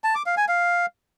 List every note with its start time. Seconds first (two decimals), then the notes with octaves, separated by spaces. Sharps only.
0.04 A5
0.15 D6
0.26 F5
0.37 G#5
0.49 F5